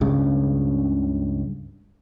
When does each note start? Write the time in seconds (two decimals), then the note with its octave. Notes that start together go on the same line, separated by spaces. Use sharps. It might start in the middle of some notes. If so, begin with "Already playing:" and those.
0.01 C#2 G2 C#3